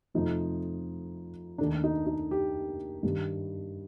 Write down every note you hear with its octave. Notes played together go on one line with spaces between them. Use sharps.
F2 C3 F3 A3 D#4
D#2 D#3 A3 D4
D#4
D#4
G4
G2 D#3 G3